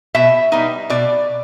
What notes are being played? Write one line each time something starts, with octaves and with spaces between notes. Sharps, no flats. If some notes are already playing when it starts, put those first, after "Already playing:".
B2 E5
G3 B3 D#4
B2 D5